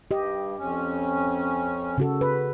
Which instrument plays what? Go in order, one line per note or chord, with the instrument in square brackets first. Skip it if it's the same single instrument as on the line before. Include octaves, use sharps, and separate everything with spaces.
[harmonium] G2 [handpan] G4 D#5
[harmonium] F2 C#4
[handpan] C#3 F#4 A4
B4